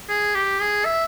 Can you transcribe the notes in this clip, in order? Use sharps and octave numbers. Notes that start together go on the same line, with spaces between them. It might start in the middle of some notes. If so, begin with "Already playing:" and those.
G#4
G4
G#4
E5